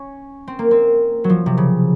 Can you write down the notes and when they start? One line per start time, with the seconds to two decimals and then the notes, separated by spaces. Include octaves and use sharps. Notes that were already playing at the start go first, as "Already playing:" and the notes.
Already playing: C#4
0.48 C4
0.59 A#3
0.71 C4
1.24 F#3
1.30 F3
1.46 C3
1.57 C#3